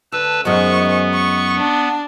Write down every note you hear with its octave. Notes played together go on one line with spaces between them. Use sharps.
D2 B4 A5 E6
F#2 D#3 G#3 B3 C5 C#6
C#6
D4